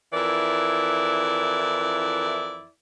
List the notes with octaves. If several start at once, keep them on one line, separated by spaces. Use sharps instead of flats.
F2 E3 E4 A#4 D5